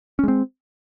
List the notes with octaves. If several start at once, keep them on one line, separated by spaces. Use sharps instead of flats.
G#3 C4 C#4